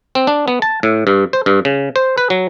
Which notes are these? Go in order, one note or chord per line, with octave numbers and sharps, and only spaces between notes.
C4
D4
B3
A5
A2
G2
C5
G2
C#3
C5
B4
F#3